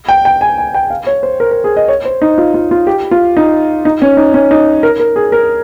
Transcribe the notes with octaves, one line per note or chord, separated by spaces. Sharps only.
G5
G5
G#5
G#5
G5
F5
C#5
C5
A#4
A#4
G#4
D#5
C#5
C5
D#4
F4
F4
F4
G4
F4
D#4
D#4
C#4
D#4
C#4
D#4
A#4
A#4
G#4
A#4